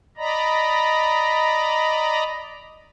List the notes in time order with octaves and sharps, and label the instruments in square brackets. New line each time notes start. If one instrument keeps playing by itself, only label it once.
[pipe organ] D5 D#5 A#5 B5